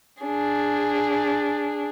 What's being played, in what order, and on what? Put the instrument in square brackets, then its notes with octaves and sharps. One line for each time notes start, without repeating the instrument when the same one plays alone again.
[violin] D4 G#4